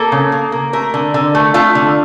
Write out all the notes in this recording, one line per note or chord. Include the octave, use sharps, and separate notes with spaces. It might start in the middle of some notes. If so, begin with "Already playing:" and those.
Already playing: A#3 A4
C#3
A#3
A#3
A3 A#4
D3
D3
A3
A3 F4
D3